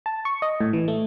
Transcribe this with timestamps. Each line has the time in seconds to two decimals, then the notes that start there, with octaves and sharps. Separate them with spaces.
0.06 A5
0.25 C#6
0.42 D#5
0.61 A2
0.73 E3
0.88 A3